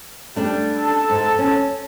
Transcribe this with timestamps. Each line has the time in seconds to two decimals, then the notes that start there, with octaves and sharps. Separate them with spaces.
0.36 G3 A3 D4
0.78 A4 A5
1.10 G#2
1.39 C#4